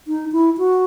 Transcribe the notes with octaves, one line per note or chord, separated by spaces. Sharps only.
D#4
E4
F#4